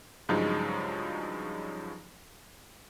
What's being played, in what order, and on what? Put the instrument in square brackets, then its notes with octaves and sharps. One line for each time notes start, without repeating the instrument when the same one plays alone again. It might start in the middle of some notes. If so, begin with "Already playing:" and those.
[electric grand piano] G2 C#3 F3 F#3 G#3 D#4